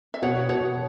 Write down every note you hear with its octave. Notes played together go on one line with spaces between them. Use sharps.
E5
B2 C#5 F#5
B2 C#5 F#5